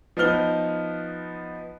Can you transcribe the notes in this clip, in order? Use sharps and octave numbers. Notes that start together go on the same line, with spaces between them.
F3 B3 D#4 F6 G7